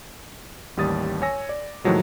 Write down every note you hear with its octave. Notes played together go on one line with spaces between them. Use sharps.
A1 D#2 G3 D#6 A6
C#5 G#5 E6 A#6
D5
A2 D#3 F3 F#3 G#3